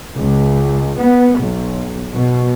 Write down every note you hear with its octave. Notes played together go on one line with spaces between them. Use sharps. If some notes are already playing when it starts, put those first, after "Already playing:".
C#2
B3
B1
B2